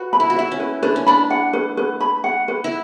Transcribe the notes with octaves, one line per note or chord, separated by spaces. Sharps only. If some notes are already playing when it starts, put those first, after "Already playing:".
Already playing: F#4 B4
B5
E4
F#4
E4 E5
C#4
B4
D4 B4
C#4
D4 B5
F#5
B4
B4
B5
F#5
B4
E4